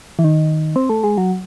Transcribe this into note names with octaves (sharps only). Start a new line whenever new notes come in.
E3
D#3
C4
A3
G#3
F#3